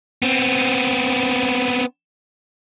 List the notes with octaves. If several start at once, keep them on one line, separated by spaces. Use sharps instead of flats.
B3 C4